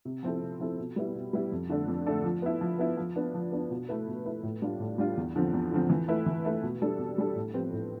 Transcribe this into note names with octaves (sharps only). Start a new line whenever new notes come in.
C3
F3 C4 E4 A4
C3
F3 C4 E4 A4
B2
G3 B3 E4
B2
G3 B3 E4
F2
D3 A3 D4 A4
F2
D3 A3 D4 A4
F3
B3 E4
F3
B3 E4
F3
B3 D4
F3
B3 D4
B2
A3 E4 B4
B2
A3 E4 B4
A2
G3 D4 F4
A2
G3 D4 F4
E2
D3 F3 C4
E2
D3 F3 C4
E3
A3 E4 B4
E3
A3 E4 B4
B2
G3 D4 A4
B2
G3 D4 A4
A2
F3 C4 G4 B4
A2